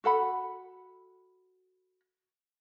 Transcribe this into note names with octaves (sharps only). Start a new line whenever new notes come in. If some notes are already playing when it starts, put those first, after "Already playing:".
F#4 A4 F#5 B5